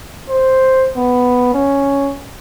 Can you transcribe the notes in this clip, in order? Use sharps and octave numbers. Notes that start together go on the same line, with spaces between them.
C5
B3
C#4